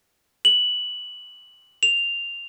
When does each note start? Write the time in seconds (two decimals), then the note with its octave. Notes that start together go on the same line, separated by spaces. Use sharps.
0.45 F#7
1.83 F7